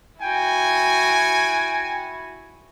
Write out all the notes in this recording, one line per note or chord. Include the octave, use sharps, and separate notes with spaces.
E4 F#4 G5 G#5